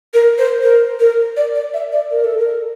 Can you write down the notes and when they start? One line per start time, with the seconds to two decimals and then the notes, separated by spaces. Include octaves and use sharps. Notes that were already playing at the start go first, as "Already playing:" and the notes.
0.14 A#4
0.38 C5
0.63 A#4
1.00 A#4
1.37 D5
1.55 D5
1.74 E5
1.92 D5
2.11 A#4
2.24 A4
2.38 A#4